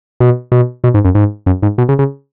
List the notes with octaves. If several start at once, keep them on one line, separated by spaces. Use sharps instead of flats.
B2
B2
B2
G#2
F#2
G#2
F#2
G#2
B2
C#3
C#3